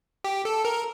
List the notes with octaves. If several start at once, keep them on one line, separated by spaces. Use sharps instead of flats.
G4
A4
A#4